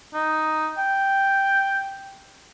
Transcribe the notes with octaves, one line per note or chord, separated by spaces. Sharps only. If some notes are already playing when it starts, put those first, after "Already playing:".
D#4
G5